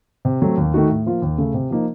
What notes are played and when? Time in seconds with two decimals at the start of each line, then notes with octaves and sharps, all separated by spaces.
0.25 C3
0.42 F#3 A3 C4
0.57 D#2
0.74 D#3 A3 D#4 F#4
0.89 A2
1.06 F3 A#3 F4
1.22 D#2
1.38 C#3 A3
1.54 C3
1.70 F3 A#3 D#4